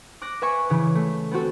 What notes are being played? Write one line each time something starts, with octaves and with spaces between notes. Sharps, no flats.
D6 F#6 A#6
B4 E5 G#5 C#6
C#3 E3
A3
B3 C4 F#4 A4